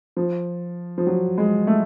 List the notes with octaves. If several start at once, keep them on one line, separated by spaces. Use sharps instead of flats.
F3
F3
F#3
G#3
A3